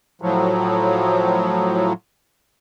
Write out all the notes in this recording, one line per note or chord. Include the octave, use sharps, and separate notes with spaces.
A2 F3 F#3